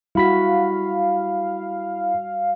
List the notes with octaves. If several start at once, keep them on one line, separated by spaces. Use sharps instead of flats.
G3 E4 F#4 F5 B5 B6